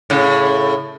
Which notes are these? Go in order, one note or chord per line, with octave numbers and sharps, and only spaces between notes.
A2 C#3